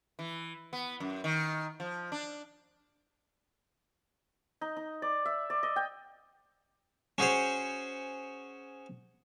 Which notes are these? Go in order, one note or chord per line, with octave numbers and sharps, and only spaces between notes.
E3
B3
F#2
D#3
F3
D4
D#4
D#4
D5
E5
D5
D#5
G5
C#4 F#4 G#4 C5 C#5